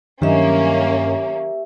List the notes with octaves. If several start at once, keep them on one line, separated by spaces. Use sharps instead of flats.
G2 D#3 F#3 A#3 C#4 G4 D#5 E5